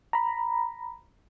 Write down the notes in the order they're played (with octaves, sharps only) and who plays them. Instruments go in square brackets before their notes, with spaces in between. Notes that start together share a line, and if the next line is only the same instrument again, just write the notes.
[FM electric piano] A#5 B5